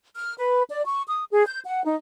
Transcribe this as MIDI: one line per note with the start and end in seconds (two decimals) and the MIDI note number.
0.16 0.34 89
0.39 0.63 71
0.70 0.84 74
0.85 1.03 85
1.08 1.23 87
1.31 1.45 68
1.46 1.59 91
1.66 1.83 78
1.84 1.95 63